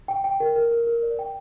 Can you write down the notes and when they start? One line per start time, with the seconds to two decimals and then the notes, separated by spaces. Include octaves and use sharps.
0.08 G5
0.24 G5
0.40 A#4
0.56 A#4
0.71 A#4
0.87 A#4
1.03 D5
1.19 G5